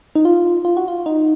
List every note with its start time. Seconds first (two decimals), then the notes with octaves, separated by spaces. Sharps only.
0.15 D#4
0.25 F4
0.65 F4
0.77 F#4
0.88 F4
1.06 D#4